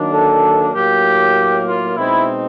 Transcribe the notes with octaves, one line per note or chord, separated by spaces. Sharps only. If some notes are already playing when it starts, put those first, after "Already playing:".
Already playing: D#3 F#3 A#3 D4
A4
A2 F#3 A#3 G4
F4
B2 G#3 C4 D#4 E4